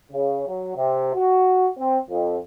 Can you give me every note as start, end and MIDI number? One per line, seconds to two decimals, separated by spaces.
0.11 0.46 49
0.47 0.72 54
0.75 1.10 48
1.14 1.68 66
1.78 1.98 60
2.09 2.37 41